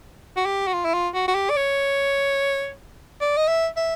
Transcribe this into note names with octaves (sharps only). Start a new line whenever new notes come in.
F#4
G4
F#4
F4
E4
F4
F#4
F#4
G4
D5
C#5
D5
D#5
E5
E5